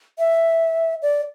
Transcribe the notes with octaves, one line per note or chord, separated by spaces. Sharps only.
E5
D5